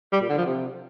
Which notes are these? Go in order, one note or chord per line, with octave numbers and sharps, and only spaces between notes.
G3
A#2
D3
F3
C3